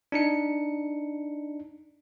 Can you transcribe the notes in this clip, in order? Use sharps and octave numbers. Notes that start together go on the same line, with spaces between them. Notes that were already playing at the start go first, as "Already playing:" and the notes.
D4 D#4 C#7